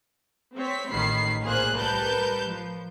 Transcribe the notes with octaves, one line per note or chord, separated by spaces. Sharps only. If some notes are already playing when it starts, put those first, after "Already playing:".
C4 C#5 B6
A1 D#3 B5 C7
C2 A#2 A#3 G#4 C5 F#6
G3 A#4 B4 A5 G6
F3